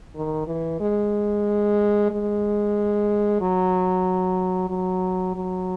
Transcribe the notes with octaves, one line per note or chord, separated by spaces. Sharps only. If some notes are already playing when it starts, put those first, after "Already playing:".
D#3
E3
G#3
G#3
F#3
F#3
F#3